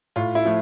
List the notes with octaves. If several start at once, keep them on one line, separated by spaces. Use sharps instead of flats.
A2 F4
E4
F3 A3